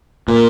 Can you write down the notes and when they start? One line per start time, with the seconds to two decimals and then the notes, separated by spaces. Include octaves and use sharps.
0.28 A#2